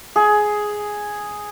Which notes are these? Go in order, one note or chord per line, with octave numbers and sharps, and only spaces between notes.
G#4